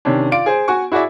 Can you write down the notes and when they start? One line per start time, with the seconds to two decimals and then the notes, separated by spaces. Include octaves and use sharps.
0.05 C3 D#3 C#4 D4
0.31 F4 D5 D7
0.46 G#4 C5
0.68 F#4 G#5 C#6
0.92 E4 F#4 G#4 D5 E5